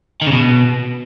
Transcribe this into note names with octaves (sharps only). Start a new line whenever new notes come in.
D#3
C#3
B2